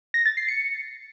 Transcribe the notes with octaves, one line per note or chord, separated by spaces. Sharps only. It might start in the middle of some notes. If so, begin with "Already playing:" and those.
A#6
A6
C7
C#7